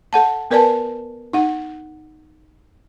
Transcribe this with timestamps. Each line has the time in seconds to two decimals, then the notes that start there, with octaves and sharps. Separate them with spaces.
0.13 A4 F#5 A5
0.51 B3 A#4 B4 D5 G#5 A5
1.33 D#4 F#5